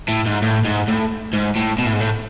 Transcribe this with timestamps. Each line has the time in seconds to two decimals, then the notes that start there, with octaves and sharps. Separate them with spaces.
0.08 A2
0.26 G#2
0.42 A2
0.65 G#2
0.88 A2
1.33 G#2
1.56 A2
1.79 B2
1.86 A2
1.93 G#2
2.00 A2